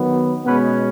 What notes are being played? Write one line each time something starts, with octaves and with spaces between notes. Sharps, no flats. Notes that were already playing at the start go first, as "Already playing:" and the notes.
Already playing: D#3 F#3 B3
B2 G#3 B3 C#4 B4